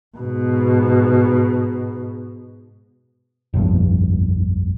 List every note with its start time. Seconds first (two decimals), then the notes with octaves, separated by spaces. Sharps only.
0.17 G#2 B2
3.54 F1 A#1 G2